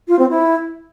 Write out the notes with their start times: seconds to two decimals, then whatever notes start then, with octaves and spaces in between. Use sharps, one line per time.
0.07 F4
0.18 C4
0.29 E4